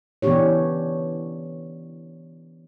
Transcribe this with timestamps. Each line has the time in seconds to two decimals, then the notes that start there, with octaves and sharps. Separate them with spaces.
0.22 E3 B3 C#4 D4 G4 C#5